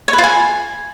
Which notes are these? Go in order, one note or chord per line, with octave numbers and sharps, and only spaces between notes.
C#5
B4
F4
G#5